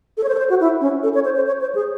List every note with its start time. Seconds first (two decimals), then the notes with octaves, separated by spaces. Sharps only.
0.17 A4
0.24 C#5
0.28 C5
0.35 A4
0.39 C5
0.50 F#4
0.61 E4
0.81 C#4
1.03 A4
1.14 C#5
1.25 C5
1.36 C5
1.47 C#5
1.61 C5
1.75 G#4